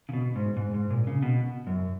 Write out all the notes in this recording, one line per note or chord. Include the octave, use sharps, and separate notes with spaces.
C#3
B2
G#2
G#2
G#2
A#2
C#3
B2
F#2